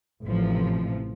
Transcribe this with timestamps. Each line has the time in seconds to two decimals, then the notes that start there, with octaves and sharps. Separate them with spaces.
0.25 A1 C3 F3